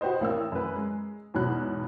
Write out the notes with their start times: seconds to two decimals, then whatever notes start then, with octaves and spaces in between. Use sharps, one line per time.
0.01 F#4 G4 B4 C5 D#5
0.21 A1 A#3 E6
0.52 F#2 B4
0.75 G#3
1.34 E2 G#2 B2 F#3 B5 F#6